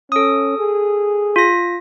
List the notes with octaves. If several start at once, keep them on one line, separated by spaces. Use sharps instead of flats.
C#4 A4 D#6
G#4
F4 A#6